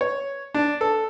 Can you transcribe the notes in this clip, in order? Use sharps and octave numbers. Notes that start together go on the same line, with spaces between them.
C#5
D4
A4